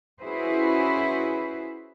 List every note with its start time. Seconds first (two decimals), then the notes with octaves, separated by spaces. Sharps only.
0.21 C#4 E4 F#4 G#4 B4 C5